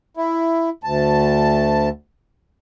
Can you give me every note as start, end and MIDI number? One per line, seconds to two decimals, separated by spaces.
0.17 0.69 64
0.84 1.89 38
0.84 1.89 81